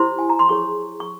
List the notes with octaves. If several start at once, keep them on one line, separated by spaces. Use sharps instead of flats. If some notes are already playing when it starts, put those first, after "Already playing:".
Already playing: E4 G4 C5 C6
G#5
A#5
C6
E4 G#4 C#5 C#6
C#6